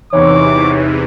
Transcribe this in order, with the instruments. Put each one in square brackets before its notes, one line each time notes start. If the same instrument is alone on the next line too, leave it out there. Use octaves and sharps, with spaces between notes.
[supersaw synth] E2 C3 E3 [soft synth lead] D#4 [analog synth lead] C#5 [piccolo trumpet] D6